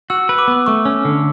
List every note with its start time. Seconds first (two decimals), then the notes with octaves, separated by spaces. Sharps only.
0.10 F#4 E6
0.29 B4
0.38 D6
0.48 B3
0.66 A3 C#6
0.85 C#4
1.05 D3